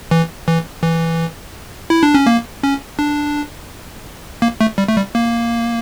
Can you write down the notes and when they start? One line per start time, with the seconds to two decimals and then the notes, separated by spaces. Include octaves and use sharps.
0.11 E3
0.48 E3
0.83 E3
1.90 E4
2.03 D4
2.14 C#4
2.27 A#3
2.63 C#4
2.99 D4
4.42 A#3
4.61 A3
4.78 G3
4.88 A3
4.96 G3
5.15 A#3